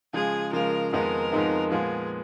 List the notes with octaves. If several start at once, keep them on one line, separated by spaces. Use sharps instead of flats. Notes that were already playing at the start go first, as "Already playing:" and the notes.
C#3 F3 G#3 G#4
C#3 F3 G#3 A#4
F2 D#3 G#3 B3 D#4 A#4
F2 D#3 G#3 B3 D#4
A#2 F3 G#3 B3 G#4